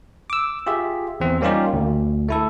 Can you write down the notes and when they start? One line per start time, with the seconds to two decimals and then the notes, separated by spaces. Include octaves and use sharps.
0.30 D6 E6
0.66 F4 G4 G#4 E5
1.20 E2 C4
1.41 G3 A#3 C#4 D#4 F4 G4
1.73 D2
2.28 A3 E4 A4